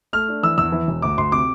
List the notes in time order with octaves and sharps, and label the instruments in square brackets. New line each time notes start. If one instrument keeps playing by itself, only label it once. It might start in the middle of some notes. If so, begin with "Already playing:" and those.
[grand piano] A3 F6
D4
E3 E6
E2 E6
E3
E1
D2 D6
D2 C6
C3 D6